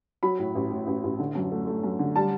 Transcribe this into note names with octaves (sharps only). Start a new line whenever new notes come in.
F#3 B5
A2
A1
A2
A1
A1
D3
F#2
A3
A3
F#2
D3
G3 A5